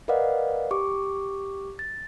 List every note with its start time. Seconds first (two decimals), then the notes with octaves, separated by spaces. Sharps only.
0.08 A#4 B4 D5 D#5 F5 F#5
0.71 G4 C#6 D6
1.79 A6